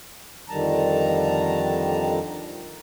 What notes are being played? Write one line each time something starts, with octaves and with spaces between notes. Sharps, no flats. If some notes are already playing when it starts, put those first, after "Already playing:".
F2 D3 D#3 G3 A5 A#5